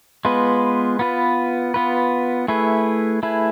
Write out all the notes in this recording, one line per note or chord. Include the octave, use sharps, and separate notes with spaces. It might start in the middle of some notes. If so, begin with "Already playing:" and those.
G#3 B3 F4 B4
B3 F4 B4
B3 F4 B4
A3 E4 G#4 B4
A3 E4 G#4 B4